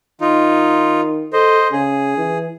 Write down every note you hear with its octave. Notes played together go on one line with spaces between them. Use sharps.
D#3 D#4 F4
A4 C5 D#5
C#3 G#4
E3